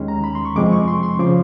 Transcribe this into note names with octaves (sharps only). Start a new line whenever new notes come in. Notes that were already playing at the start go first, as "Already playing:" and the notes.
Already playing: D#2 D#3 G#3 C#4
A#5
B5
C6
C#6
F2 C3 F3 G#3 C4 D6
C#6
C6
C6
C#3 F3 D6